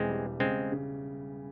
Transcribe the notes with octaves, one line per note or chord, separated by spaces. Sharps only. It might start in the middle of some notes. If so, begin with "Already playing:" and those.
Already playing: E1 E3 G#3 C4
G3
C#3 G#3 C4
C#3